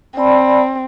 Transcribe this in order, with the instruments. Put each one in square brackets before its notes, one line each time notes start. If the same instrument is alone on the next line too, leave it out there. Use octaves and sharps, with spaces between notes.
[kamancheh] C4 [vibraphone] D5 A5 B5